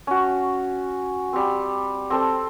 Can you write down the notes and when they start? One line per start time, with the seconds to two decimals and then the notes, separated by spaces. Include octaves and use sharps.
0.07 C#4 F#4
1.33 G3 C4
2.10 C4 A4 C5